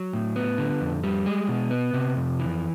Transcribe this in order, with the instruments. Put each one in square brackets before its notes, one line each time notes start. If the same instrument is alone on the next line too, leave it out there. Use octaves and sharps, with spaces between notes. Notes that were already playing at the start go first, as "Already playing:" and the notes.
Already playing: [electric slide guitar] F#3
A2
B3
D3
F2
G3
G#3
B2
B3
C3
F2
E3